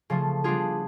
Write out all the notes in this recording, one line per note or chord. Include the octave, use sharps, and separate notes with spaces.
C#3 F3 A3
G3 B3 D4 F4 G#4